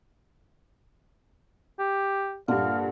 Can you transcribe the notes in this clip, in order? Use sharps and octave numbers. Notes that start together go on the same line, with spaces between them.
G4
G2 A#2 D3 F5